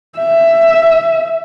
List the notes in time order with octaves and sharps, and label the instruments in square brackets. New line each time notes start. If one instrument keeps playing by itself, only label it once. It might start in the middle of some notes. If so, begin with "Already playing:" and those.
[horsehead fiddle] E5